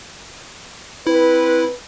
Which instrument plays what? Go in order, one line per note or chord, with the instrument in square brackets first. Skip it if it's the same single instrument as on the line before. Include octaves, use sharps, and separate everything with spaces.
[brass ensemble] C4 B4 [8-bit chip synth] E4